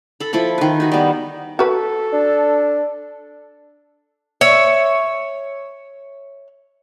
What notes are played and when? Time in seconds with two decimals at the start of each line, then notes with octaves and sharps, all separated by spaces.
0.20 A4 B5
0.33 F3 E4 A4 B5
0.58 D#3 B4
0.80 D#4 F#4
0.92 G3 B3
1.59 F#4 A4 B4
2.13 D4
4.41 C#5 E5